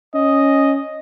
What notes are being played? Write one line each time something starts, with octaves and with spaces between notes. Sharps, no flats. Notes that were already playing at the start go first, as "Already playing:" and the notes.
C#4 D#5